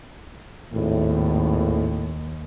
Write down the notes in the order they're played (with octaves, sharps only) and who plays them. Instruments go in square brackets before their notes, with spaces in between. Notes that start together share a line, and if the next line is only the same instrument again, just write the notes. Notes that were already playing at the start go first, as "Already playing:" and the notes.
[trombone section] G#1 A2 [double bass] D#2